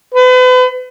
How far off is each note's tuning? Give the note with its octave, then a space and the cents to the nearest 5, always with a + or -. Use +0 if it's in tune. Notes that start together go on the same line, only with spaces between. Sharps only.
B4 +40